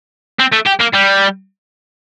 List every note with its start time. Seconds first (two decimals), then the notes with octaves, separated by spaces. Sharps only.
0.40 C4
0.53 A3
0.67 G4
0.81 A#3
0.94 G3